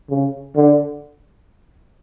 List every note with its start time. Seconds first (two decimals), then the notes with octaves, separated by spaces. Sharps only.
0.10 C#3
0.56 D3